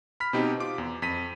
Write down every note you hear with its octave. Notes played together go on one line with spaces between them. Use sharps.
B5 F6 B6
B2 C4 D#4 G4
F4 D6
E2
F2 B6 D#7